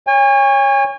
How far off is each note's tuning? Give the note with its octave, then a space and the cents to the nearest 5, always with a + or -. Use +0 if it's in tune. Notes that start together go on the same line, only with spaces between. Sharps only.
C#5 +0 G#5 -40